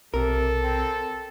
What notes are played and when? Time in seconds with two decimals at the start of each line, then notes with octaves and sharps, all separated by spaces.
0.14 B1 C3 A4 A#4
0.63 C4